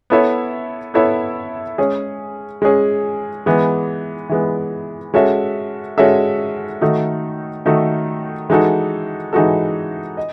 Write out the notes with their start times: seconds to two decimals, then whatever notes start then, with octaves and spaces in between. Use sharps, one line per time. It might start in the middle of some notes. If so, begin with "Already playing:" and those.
0.10 B3 E4 A4 C#5 E5
0.94 B3 E4 A4 C#5 E5
1.78 G#3 C#4 G#4
2.62 G#3 C#4 G#4
3.46 E3 G#3 B3
4.29 E3 G#3 B3
5.14 G#3 C#4 F#4 A4 E5
5.98 G#3 C#4 F#4 A4 E5
6.82 D#3 A3 D#4 F#4 A4
7.66 D#3 A3 D#4 F#4 A4
8.49 E3 G#3 D#4 F#4 A4
9.33 E3 G#3 D#4 F#4 A4
10.17 D#5